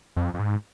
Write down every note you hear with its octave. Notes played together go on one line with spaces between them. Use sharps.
F2
F2
G#2